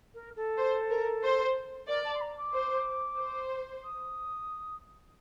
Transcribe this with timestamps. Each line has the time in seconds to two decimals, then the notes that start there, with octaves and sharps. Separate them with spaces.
0.14 A#4
0.36 A4
0.58 C5
0.90 A#4
1.23 C5
1.87 A#4 D5
2.04 A5
2.14 C6
2.21 A#5
2.37 D6
2.53 C5
3.18 C5
3.84 D#6